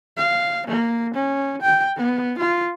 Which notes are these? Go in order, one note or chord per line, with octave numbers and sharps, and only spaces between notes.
F5
A#3
C#4
G5
B3
F4